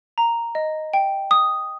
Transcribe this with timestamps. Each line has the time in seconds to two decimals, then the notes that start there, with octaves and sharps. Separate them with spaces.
0.18 A#5
0.55 D#5
0.94 G5
1.31 D#6